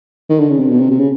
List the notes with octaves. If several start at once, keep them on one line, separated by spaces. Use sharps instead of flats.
D#3
D3
C#3
C3
B2
C3
C3
C#3